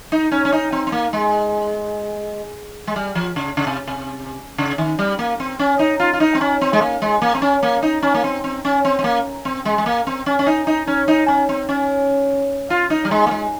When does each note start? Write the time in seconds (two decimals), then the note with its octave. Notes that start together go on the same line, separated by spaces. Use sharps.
0.12 D#4
0.32 C#4
0.45 C#4
0.52 D#4
0.72 C4
0.87 C4
0.92 A#3
1.13 G#3
2.87 G#3
2.96 G3
3.15 F3
3.36 C#3
3.57 C#3
3.67 C3
3.87 C3
4.58 C#3
4.78 D#3
4.99 G3
5.19 A#3
5.40 C4
5.59 C#4
5.79 D#4
6.00 F4
6.13 F4
6.20 D#4
6.35 C4
6.41 C#4
6.61 C4
6.73 G#3
6.81 A#3
7.02 G#3
7.22 A#3
7.35 C4
7.42 C#4
7.63 A#3
7.83 D#4
8.03 C#4
8.15 A#3
8.24 C4
8.44 C4
8.65 C#4
8.85 C4
8.99 C4
9.04 A#3
9.45 C4
9.65 G#3
9.78 G#3
9.86 A#3
10.07 C4
10.26 C#4
10.39 C#4
10.47 D#4
10.67 D#4
10.87 C#4
11.08 D#4
11.28 C#4
11.49 C4
11.69 C#4
12.70 F4
12.90 D#4
13.05 G3
13.11 G#3
13.27 A#3
13.31 G#3